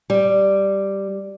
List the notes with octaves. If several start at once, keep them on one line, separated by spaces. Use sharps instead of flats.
G3